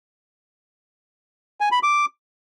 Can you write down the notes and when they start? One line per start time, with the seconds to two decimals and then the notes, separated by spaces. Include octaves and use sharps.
1.61 G#5
1.72 B5
1.83 D6